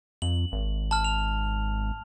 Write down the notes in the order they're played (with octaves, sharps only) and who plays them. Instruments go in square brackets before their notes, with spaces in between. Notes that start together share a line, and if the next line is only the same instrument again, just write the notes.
[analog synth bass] F2 [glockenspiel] F#7
[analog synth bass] G#1
[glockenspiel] A5 F6
F7